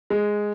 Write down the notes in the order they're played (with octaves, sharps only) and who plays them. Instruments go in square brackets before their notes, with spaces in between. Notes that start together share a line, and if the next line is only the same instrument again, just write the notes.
[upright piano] G#3